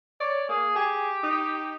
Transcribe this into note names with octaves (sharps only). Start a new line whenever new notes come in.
C#5 D5
A#3 G#4
G4 G#4
D#4